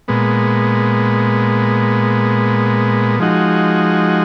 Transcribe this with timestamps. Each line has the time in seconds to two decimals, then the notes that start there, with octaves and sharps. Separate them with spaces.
0.08 A#2 G#3 B3
3.20 F3 G#3 D#4 F#4